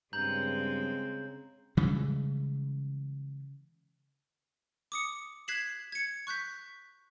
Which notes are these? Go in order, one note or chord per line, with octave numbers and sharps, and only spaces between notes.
G2 C#3 G#3 C4 A#5 G6 F#7
C#3 E3 G3 G#3
D6 D#6 C#7
F#6 G#6 B6 C7 E7 F#7
G#6 C#7
C#6 F#6 G6 B6